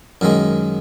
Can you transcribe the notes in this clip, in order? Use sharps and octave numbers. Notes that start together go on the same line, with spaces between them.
F#2 D#3 G#3